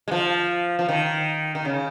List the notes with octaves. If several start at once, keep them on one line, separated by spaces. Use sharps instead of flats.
G#3
F3
F3
D#3
D#3
C#3